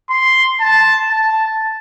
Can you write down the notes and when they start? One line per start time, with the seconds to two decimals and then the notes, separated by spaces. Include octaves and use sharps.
0.10 C6
0.60 A5
1.11 A5